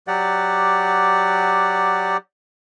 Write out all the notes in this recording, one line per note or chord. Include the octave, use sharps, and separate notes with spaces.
F#3 G4 D5 F#5